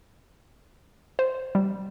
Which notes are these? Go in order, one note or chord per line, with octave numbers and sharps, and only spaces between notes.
C5
G3